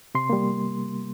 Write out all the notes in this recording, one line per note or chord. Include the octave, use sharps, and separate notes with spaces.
C3 C6
G3 A#3